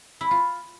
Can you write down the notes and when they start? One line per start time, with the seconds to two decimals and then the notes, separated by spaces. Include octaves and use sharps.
0.21 E4
0.31 F4